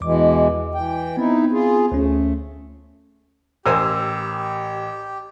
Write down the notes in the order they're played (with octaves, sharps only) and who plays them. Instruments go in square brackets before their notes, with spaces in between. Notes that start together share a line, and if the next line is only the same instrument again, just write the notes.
[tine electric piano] E2 D6 [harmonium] B2 E3 G#3
[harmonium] E3 G5
[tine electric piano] B3 C4 [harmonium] D#4 E4
[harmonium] F4 G#4
[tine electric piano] D2 C#4 [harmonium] A3
[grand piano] A1 [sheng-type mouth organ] G4 [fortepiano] A#4 C5 G#5 [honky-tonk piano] E6